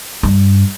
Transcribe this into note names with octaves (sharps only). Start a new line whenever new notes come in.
G2